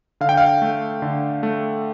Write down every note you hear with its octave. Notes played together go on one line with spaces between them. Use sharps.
D3 F5
G5
F5
A3
D3
A3